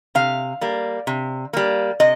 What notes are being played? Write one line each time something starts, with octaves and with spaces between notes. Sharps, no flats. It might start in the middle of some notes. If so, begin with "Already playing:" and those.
C3 F5
G3 A#3
C3
G3 A#3
C3 D#5